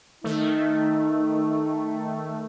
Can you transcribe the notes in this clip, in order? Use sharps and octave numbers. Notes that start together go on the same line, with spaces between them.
D#3 A3 D#4